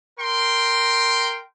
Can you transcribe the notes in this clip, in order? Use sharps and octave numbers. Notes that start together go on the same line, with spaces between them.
A#4 G5 C6